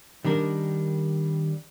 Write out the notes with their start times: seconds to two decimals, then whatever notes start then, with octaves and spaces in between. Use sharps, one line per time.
0.25 D#3 G3 D4 A#4